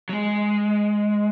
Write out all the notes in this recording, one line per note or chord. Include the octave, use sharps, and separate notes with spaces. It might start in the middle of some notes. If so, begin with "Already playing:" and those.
F#3
G#3